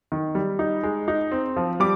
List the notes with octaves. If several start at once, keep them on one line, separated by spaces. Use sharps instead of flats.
D#3
G3
D#4
G#3
D#4
C4
F3
G3 D6